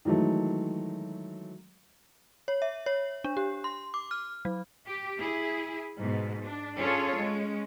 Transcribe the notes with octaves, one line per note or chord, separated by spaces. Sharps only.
D#3 E3 F#3 G#3 A3
C#5
E5
C#5
D4
G4
C6
D6
F6
F#3
G4
E4 G#4
G#2 B2
D4
C#4 D4 F4 G#4 A4 C#5
G#3 C#4